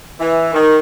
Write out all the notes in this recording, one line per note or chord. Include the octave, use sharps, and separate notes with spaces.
E3
D#3